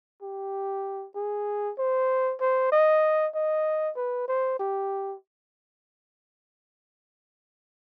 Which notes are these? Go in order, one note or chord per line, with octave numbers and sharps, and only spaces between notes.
G4
G#4
C5
C5
D#5
D#5
B4
C5
G4